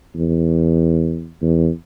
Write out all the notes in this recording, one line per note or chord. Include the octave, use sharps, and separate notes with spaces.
E2
E2